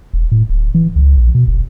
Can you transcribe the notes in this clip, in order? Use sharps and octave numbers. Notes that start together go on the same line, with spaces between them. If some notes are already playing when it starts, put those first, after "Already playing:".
E1
A2
D1
E3
C#2
A#1
B2
F1